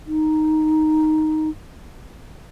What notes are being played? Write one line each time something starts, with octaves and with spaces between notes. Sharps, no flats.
D#4